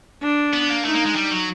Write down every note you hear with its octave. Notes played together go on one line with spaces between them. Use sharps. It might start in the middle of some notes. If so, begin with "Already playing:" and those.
D4
B3
A#3
A3 D#4
A#3
G#3
G3
F#3